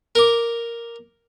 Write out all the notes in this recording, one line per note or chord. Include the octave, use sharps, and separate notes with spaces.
A#4 D6